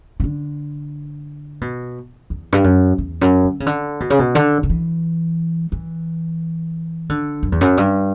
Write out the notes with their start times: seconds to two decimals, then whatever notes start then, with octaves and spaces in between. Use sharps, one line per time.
0.20 E3
0.24 D3
1.61 B2
2.30 E2
2.52 G2
2.64 F#2
2.98 E2
3.21 F#2
3.44 D3
3.60 C#3
3.66 D3
4.00 B2
4.10 C#3
4.19 B2
4.35 D3
4.63 D3
4.70 E3
5.72 E3
7.09 D3
7.43 F#2
7.52 E2
7.61 F#2
7.77 G2